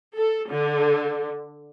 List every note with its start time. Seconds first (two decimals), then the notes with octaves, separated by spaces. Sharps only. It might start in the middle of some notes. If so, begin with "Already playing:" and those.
0.16 A4
0.50 D3